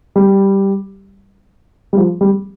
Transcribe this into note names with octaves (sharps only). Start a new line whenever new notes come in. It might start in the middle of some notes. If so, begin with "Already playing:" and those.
G3
G3
F3
G3